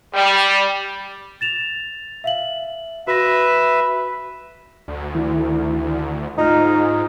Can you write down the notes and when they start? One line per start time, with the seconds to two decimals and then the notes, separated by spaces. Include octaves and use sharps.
0.14 G3
1.41 A6 E7 F7
2.24 E5 F5 F#7
3.07 F#4 B4 E5 A#6
4.88 D2
5.15 D#3 E4
6.38 G#2 D#4 F4 F6